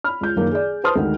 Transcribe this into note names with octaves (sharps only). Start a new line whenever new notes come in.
B5 F6
C#2 G6
F#1 D#3 A#3
G#4 D5
B4 C5 A5 C6 D#6 F6
D2 D#3 G#3 F#5